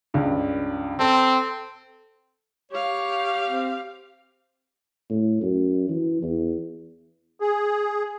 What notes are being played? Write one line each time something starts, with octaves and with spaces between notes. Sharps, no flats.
C#2 G2
C4 A4
G4 C#5 F5
C4
A2
F#2
E3
E2
G#4